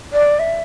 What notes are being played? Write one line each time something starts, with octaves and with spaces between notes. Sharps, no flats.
D5
E5